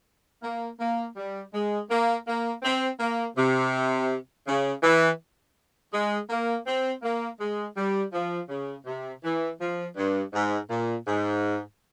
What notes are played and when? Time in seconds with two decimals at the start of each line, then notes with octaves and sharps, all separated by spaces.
0.42 A#3
0.80 A#3
1.16 G3
1.52 G#3
1.89 A#3
2.26 A#3
2.63 C4
2.99 A#3
3.36 C3
4.46 C#3
4.83 E3
5.92 G#3
6.29 A#3
6.66 C4
7.03 A#3
7.39 G#3
7.76 G3
8.13 F3
8.49 C#3
8.86 C3
9.23 E3
9.60 F3
9.96 G2
10.33 G#2
10.70 A#2
11.06 G#2